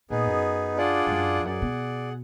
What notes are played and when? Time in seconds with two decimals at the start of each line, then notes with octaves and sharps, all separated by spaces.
0.10 A#2 B3 D#4 G#4
0.27 F#2
0.77 D4 F4 G#4 D5 F#5
1.06 G#2
1.11 F#2
1.40 F2
1.45 F#2 G#4 D5 F#5
1.62 B2